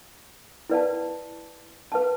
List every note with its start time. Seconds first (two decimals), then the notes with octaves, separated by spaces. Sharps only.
0.70 E4 B4 D5 F5 A5
1.92 B4 F5 A5